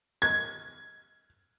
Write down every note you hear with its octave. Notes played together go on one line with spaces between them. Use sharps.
G#6